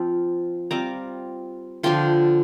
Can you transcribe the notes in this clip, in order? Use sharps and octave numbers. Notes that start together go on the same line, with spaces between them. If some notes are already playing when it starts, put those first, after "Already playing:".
Already playing: F3 C4 F4
G3 C4 F4 A#5 D6
D3 F3 D4 F4 G5 C6